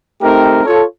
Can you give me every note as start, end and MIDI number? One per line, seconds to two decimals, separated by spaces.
0.22 0.65 57
0.22 0.65 60
0.22 0.65 63
0.22 0.65 67
0.22 0.65 70
0.65 0.84 65
0.65 0.84 69
0.65 0.84 73